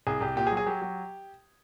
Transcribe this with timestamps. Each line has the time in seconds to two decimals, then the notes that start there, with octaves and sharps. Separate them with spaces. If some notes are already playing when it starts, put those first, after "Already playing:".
0.07 C2 G#4
0.21 C2 G4
0.36 A#2 G4
0.47 G#4
0.52 F#3
0.57 G#4
0.67 F#3 G4
0.82 F#3